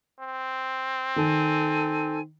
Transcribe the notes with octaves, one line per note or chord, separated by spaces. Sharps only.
C4
D#3 A4 G#5